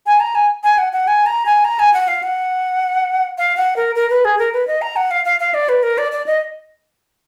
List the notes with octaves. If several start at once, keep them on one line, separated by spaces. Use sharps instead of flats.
G#5
A#5
G#5
G#5
F#5
F#5
G#5
A#5
G#5
A#5
G#5
F#5
F5
F#5
F5
F#5
A#4
A#4
B4
G#4
A#4
B4
D#5
A#5
F#5
F5
F5
F5
D5
B4
A#4
D5
D5
D#5